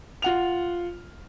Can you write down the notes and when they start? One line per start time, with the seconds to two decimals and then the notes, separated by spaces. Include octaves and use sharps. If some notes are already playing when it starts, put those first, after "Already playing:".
0.22 F4 F#5 F7